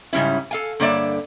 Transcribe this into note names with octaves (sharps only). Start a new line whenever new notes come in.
G#2 C#3 G3 C#4 E4
A4 F5 G#5
G2 D3 A#3 C#5 D5 E5